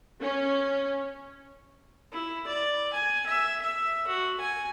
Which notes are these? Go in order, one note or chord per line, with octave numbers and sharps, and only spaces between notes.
C#4
E4
D5
G#5
E5
E5
F#4
G#5